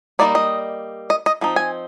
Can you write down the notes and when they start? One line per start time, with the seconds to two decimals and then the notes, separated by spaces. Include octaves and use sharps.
0.19 G3 A#3 D#4 D5
0.35 D#5
1.10 D#5
1.26 D#5
1.41 F3 C4 D#4
1.56 G#5